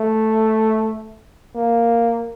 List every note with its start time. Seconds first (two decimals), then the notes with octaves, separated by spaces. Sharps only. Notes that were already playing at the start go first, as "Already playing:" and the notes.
Already playing: A3
1.56 A#3